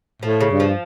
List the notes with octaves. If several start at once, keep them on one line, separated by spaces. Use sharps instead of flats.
A2 F3
C#3
G2
F3